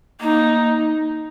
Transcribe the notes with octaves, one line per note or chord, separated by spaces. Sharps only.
A#3 D#4